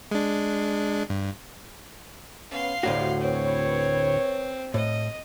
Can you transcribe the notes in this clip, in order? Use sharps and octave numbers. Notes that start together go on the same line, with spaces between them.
G#3 D4
G2
B3 C#4 F5 C6
D2 A2 G3 C4 F#4
C4 B4 C#5
A2 D#5